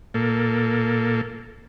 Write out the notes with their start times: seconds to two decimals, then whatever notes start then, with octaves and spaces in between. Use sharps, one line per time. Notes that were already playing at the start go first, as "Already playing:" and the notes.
0.14 A#2 A#3 A4